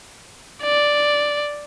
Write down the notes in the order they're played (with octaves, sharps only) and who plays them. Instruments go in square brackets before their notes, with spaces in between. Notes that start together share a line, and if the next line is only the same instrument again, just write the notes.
[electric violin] D5